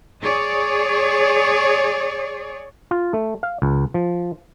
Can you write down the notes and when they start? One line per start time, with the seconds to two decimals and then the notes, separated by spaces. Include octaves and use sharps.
0.23 G#4 C#5 D5
2.91 F4
3.13 A3
3.43 F5
3.62 C#2
3.94 F3